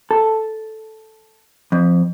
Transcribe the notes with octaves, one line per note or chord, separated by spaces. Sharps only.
A4
F2